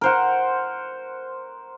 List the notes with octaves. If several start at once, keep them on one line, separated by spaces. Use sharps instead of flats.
A#4 C5 F#5